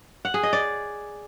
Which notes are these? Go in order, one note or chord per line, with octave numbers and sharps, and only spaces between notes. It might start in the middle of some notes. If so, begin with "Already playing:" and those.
F#5
G#4
D#5
D5